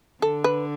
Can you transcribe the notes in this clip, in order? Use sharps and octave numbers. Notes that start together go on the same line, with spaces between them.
D3 A4
B4